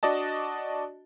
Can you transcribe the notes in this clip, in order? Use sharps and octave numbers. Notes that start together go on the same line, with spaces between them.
D4 F#4 D5 D#5 A5